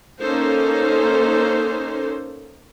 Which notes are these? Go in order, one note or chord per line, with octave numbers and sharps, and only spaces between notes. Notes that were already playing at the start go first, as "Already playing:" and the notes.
A#3 C#4 D#4 A4 C5